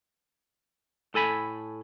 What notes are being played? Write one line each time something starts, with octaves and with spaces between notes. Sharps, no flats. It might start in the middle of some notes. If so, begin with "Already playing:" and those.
A2 A4 G#5 B5